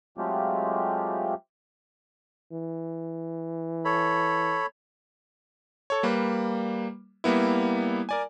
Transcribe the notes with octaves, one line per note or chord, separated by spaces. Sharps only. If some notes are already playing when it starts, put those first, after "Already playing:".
F#3 G#3 A3 C4 F4 G4
E3
A4 C#5 B5
A4 C#5
G3 A#3 B4
G3 A#3 B3 E4
A#4 D5 G#5